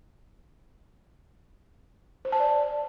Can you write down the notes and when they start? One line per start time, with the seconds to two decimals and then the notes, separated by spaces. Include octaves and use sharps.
2.25 C5
2.32 A5
2.40 D5